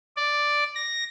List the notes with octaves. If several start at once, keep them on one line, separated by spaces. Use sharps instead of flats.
D5
A#6